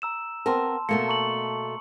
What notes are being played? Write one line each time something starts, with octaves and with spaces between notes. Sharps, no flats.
A#5 E6 E7
B3 C4 A#4 A5 C6
B2 A3 A#3 C#7
A#5 C#6 F#7